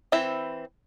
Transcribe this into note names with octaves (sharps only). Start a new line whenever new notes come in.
E3 C4 E4 C5 E5